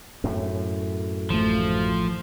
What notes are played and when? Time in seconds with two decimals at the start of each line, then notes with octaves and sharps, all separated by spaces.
0.24 F#2 A2
1.30 A1 F3 A3